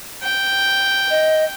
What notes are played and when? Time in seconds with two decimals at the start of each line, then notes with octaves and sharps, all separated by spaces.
0.23 G5
1.10 D#5